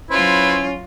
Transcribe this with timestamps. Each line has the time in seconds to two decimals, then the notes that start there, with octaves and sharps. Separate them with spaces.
0.10 F#3 C#4 E4 F4 B4 C5